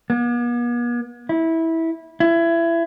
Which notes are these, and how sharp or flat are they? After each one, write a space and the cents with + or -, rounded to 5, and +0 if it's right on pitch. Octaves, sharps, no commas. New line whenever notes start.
B3 -45
E4 -15
E4 +25